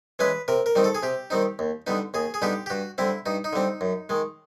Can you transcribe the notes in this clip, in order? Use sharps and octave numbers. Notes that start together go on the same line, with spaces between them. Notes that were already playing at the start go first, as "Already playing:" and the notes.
E3 G#3 C#4 B4
C3 A#4
A#4
D#3 G3 C4 D#4
A4
G#4
C3 G4
D#3 G3 C4 D#4
D#2
D3 G3 B3 D#4
D#2 G#4
G#4
D3 G3 B3 D#4 G4
G4
G2 F#4
D3 G3 C4 E4
G2 D#4
D#4
D3 G3 C4
F#2
D#3 G#3